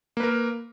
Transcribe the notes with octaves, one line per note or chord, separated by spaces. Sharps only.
A#3 A#4 B4